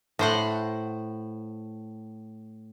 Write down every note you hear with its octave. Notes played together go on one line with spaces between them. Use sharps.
A2 C5 F#5